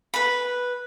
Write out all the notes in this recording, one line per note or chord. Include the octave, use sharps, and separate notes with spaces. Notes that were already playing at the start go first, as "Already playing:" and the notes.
B4 B5